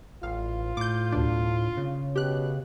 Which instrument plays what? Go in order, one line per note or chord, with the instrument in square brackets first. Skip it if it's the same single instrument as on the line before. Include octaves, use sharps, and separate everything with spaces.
[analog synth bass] A1 [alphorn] F4 [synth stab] F5
[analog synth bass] A2 [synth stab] D6 G6
[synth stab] D2 B2 D4
[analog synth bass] C#3
[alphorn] B2 [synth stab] G4 F#6